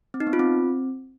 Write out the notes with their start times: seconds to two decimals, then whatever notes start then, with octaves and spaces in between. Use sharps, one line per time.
0.14 C4
0.20 D#4
0.27 B3
0.33 F4
0.39 C4